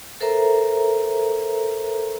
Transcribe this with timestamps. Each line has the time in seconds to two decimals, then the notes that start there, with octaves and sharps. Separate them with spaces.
0.21 A4 A#4 C5 E5 A#5